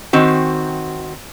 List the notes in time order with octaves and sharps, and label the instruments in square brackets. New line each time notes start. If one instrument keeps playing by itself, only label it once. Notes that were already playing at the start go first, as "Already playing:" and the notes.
[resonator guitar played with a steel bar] D#3 C4 F#4